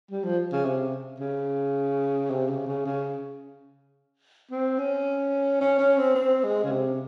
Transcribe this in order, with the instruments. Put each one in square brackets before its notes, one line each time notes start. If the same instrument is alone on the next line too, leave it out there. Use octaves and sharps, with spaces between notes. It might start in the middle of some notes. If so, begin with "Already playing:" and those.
[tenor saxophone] G3
F3
C#3
C3
C#3
C3
C#3
C#3
C#3
C4
C#4
C#4
C#4
C4
C4
G#3
C#3
C3